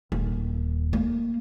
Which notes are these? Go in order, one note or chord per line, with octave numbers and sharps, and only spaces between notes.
D#1
A#3